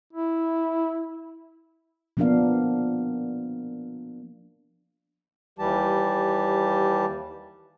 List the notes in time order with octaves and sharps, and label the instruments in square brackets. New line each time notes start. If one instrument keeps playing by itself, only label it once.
[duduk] E4
[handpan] F3 A#3 B3 D4 A#4 F5
[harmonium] D#2 E3 G3 G4 A5